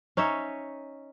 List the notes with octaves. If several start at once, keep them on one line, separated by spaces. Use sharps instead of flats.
C#4 D#4 C#5 E5